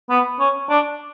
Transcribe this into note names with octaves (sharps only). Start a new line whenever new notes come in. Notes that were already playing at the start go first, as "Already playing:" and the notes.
B3
C#4
D4